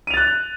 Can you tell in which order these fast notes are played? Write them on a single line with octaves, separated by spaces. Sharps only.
D#7 F7 A6 F#6